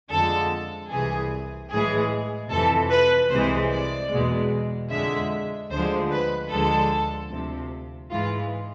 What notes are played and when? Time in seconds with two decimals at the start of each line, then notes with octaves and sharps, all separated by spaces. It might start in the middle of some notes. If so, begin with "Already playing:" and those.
0.12 F2 D3 F3 G#3 A4
0.91 C2 C3 E3 G#4
1.71 A2 E3 G#3 G#4
2.51 F2 C3 E3 A4
2.91 B4
3.31 C2 C3 E3 G#3 C5
3.71 D5
4.12 E2 B2 G#3
4.91 F2 D3 G#3 E5
5.71 D2 D3 F3 G#3 C5
6.11 B4
6.51 D2 D3 F3 G#3 A4
7.31 D2 C3 F3
8.11 G#2 E3 G#3 F4